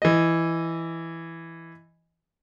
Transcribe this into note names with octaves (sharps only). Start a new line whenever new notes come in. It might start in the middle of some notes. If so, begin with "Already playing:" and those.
E3 D#5